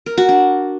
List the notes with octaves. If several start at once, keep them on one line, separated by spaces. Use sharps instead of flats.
A#4
F#4
D4